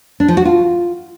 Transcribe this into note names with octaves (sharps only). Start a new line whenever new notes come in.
D4
F3
F#4
F4